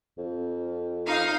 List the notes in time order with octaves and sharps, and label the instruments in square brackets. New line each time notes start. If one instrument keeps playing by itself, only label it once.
[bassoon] F2
[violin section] D#4 F5